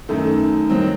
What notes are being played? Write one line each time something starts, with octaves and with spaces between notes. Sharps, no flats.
F#2 D#3 A3
D#3 F#3 C4